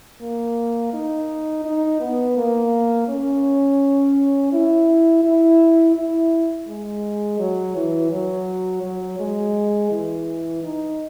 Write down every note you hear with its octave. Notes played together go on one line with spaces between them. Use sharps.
A#3
D#4
D#4
B3
A#3
C#4
E4
E4
E4
G#3
F#3
E3
F#3
F#3
G#3
E3
D#4